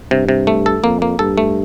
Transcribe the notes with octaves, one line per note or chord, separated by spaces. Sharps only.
G2 C3
C3
A3
A4
F2 A#3
A#3
G2 A4
A3